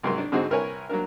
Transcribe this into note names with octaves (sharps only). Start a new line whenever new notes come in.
C2 G#2 F#3 A#4 C6
D4
G#2 D3 C4 D#4 F#4 G#4
C2 A#4 B4 C#5 G#5
F#3 A#3 D4 A#4